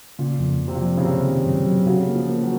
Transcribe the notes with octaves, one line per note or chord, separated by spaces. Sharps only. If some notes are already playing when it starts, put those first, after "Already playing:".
A#2 C#3
F2
F2
C3
A#2
F3
C#3
F#2 C3
D#3
F#2
F#3
C#3 F#4
A#3
F3
A#3
F#3